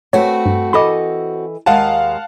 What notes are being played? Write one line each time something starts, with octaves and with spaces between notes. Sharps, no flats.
A3 C4 F#4 B4 C#5
G2
E3 A4 D#5 B5 D6
D#2 G#3 F5 F#5 A5